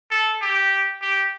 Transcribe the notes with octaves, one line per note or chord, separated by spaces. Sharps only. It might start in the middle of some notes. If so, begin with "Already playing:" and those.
A4
G4
G4